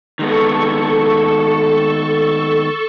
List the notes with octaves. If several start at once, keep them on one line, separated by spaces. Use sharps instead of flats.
D#3 G#3 B3 A4 C#6